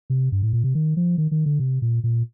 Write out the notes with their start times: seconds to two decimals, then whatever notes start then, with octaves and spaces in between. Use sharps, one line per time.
0.10 C3
0.32 G2
0.42 A2
0.53 A#2
0.64 C3
0.75 D#3
0.97 F3
1.18 D#3
1.31 D#3
1.46 D3
1.60 C3
1.82 A#2
2.04 A#2